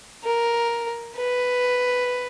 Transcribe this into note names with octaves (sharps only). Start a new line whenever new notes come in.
A#4
B4